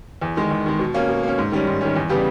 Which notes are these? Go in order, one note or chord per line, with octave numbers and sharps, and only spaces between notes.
E2
D#3 G#3
E2
D#3 G#3
B2
A#3 C#4
B2
A#3 C#4
G#2
D#3 G3 C#4
G#2
D#3 G3 C#4
E2
C#3 G3 B3 G4